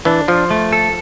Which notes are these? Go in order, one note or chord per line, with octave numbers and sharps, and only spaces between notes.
E3 D4
F3 F4
A3
A4